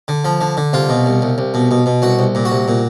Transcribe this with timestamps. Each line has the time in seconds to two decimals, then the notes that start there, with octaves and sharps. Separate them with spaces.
0.08 D3
0.24 F3
0.41 D3
0.57 D3
0.73 C2 F4
0.89 B2
1.06 C2
1.22 C2
1.38 C2
1.54 B2
1.71 B2
1.86 B2
2.02 C2 F#4
2.19 C2
2.35 A#2
2.45 F#4
2.52 C2
2.68 A#2